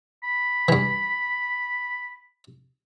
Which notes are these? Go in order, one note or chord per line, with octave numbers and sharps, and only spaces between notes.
B5
G2 E3